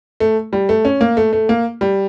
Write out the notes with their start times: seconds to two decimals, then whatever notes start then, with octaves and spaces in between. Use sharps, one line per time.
0.20 A3
0.53 G3
0.69 A3
0.85 C#4
1.01 A#3
1.17 A3
1.33 A3
1.49 A#3
1.81 G3